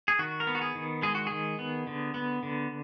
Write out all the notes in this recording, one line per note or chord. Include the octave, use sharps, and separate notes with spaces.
G#4
D#3 F#4
A#4
B3
F#4
G#4
D#3
G#3 G#4
F#4
D#3 G#4
B3
D3
B3
D3